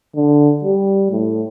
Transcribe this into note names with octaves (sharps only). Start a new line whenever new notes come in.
D3
G3
A2